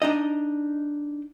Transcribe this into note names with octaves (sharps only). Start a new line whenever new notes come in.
D4 D#4 D#5